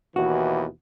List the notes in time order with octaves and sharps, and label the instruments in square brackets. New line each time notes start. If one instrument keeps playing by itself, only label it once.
[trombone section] D#2 B2 E3 [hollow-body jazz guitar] F#4